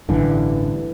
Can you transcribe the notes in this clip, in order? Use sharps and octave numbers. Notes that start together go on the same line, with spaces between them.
A1 G2 D3 E3